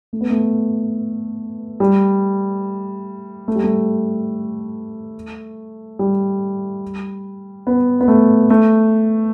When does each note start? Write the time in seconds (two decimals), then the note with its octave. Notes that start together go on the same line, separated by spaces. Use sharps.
0.13 A3
0.21 B3
0.30 A3
1.80 G3
3.48 A3
3.56 G3
3.64 A3
5.99 G3
7.67 B3
8.01 B3
8.08 A3
8.50 A3